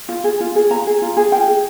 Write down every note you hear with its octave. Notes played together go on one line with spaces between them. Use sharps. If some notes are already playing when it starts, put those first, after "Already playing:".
F4
G#4
F4
G#4
F4 A#5
G#4
F4
G#4
F4 G5
G#4